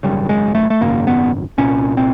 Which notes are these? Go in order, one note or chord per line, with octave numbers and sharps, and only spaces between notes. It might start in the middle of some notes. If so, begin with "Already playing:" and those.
G#1 F#2 C#3 G3
G#3
A3
A3
G#1 F#2 C#3 A#3
B3
C2 A#2 C#4
C4